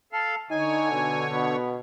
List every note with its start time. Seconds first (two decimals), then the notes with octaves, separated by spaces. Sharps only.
0.12 A4 F5
0.50 D3 D#4 C#5 G#5
0.92 B2
1.31 B2 B3